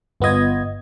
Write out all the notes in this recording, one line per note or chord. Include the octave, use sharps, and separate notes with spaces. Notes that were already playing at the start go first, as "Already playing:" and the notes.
G1 B3 F4 D#5 G#6